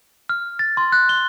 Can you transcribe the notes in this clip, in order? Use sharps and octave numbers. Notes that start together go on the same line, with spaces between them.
F6
A6
C6
F#6
G7